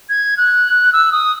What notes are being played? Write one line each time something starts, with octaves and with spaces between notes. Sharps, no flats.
G#6
F#6
E6
D#6